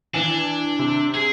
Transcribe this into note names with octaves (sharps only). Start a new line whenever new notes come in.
E3 D4
C3
G#4